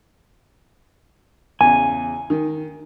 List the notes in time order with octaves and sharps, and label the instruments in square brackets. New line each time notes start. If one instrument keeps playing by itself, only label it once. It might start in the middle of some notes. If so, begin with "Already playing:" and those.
[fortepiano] E2 C#3 [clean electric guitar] G#5
[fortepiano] D#3